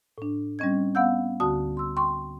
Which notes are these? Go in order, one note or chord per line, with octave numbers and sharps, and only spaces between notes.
A2 D4
G3 C4 C#4 D#5 G#6
B3 F5 F#5 E6 G6
D2 D3 F#4 A5 D#6
C6 E6
G5 C6 C#6